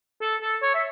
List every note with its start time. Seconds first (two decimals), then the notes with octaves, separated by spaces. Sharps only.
0.21 A4
0.41 A4
0.62 C#5
0.74 E5